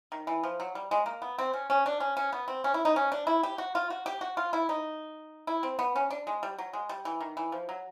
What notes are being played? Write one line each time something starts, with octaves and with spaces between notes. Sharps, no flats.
D#3
E3
F3
F#3
G3
G#3
A#3
B3
C4
C#4
C#4
D4
C#4
C#4
B3
C4
C#4
E4
D#4
C#4
D4
E4
G4
F#4
F4
F#4
G4
F#4
F4
E4
D#4
E4
C4
B3
C#4
D4
G#3
G3
F#3
G#3
G3
E3
D#3
E3
F3
F#3